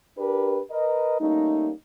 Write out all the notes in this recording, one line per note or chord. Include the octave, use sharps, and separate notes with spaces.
D4 G4 A#4 B4
A#4 B4 D#5
G3 A3 A#3 C#4 D#4